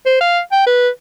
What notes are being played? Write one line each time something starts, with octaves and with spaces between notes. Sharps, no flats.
C5
F5
G5
B4